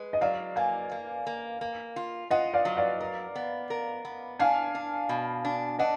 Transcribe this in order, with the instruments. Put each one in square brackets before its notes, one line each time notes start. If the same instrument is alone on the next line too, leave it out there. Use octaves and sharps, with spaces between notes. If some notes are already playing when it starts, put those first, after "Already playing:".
Already playing: [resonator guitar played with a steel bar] G#3 [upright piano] B4
[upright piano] D#5
[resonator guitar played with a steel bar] F#3 [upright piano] D5 F5
[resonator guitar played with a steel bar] A#3 [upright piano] F5 G#5
[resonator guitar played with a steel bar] A#3
A#3
A#3
F4
[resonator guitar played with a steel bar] F4 [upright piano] D#5 F#5
[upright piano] D5 F5
[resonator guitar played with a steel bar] F#3
[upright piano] D5 F5
[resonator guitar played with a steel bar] A#4
B3
A#4
B3
[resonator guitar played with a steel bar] D4 [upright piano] F5 G#5
[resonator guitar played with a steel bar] D4
B2
D4
[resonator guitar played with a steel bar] D4 [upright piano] D#5 F#5